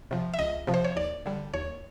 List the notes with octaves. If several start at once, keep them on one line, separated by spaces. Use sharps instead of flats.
C3 F3
E5
C#2 D#5
C3 F3
C5
C#5
D#2 D5
D3 G3
D#2 C#5